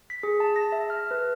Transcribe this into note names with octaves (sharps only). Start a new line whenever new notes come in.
B6
G#4
A5
A#6
E5
F6
B4